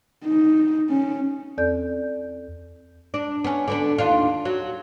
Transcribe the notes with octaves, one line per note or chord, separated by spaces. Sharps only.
D#4
C#4
E2 C4 A4 D5 G6
D4
B3 C#4
D3 B3 D4
D#2 D4 F4
F#3